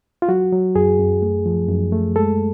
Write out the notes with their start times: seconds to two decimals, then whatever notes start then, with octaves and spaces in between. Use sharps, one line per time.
0.22 F4
0.29 F#3 F#4
0.52 F#3
0.75 F#2 G#4
0.99 F#2
1.22 A3
1.46 F3
1.69 F#2
1.92 A3
2.16 G#3 A4